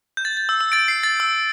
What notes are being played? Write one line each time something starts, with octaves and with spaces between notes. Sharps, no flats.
G6
A6
A6
E6
E6
A6 D7
C7
A6
E6